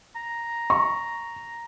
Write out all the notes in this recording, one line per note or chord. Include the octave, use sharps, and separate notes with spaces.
A#5
C#6